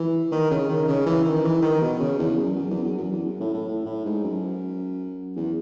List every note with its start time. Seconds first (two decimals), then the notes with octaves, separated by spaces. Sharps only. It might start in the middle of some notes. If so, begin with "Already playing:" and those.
Already playing: E3
0.32 D#3
0.51 C#3
0.69 D#3
0.88 C#3
1.06 E3
1.25 D#3
1.44 E3
1.62 D#3
1.81 B2
2.00 C#3
2.18 E2
2.37 F#2
2.56 F#2
2.70 E2
2.84 F#2
2.97 F#2
3.12 E2
3.26 F#2
3.40 A2
3.54 A2
3.68 A2
3.86 A2
4.05 G#2
4.24 F#2
5.36 E2